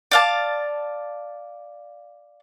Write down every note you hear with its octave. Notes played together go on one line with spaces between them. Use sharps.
D5 F5 A5